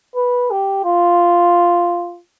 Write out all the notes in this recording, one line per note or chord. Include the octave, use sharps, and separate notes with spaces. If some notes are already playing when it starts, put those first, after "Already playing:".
B4
G4
F4